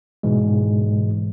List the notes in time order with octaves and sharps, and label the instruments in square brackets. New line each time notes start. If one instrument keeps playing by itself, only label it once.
[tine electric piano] G#2 B2 E3 G#3